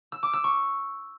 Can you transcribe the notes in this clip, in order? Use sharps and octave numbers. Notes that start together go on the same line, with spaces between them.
E6
D6
E6
C#6